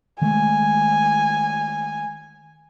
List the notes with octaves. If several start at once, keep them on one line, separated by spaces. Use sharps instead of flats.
D#3 G#3 A3 G#5